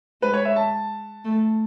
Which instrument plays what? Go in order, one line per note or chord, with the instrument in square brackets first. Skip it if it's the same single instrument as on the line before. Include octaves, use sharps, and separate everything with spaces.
[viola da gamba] G#3 [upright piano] B4
[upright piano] C#5
E5
A5
[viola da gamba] A3